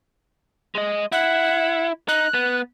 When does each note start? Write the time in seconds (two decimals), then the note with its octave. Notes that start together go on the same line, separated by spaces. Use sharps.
0.75 G#3 D#5
1.12 E4 F#5
2.08 D#4 F#6
2.34 B3